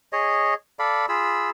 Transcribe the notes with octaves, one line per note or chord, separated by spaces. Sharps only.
G#4 C#5 D#5
A4 D5 F5 B5
F4 G#4 B5 E6